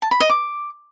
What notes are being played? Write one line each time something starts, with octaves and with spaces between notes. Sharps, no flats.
A5
B5
D#5
D6